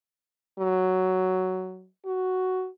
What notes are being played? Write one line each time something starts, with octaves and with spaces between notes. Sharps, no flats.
F#3
F#4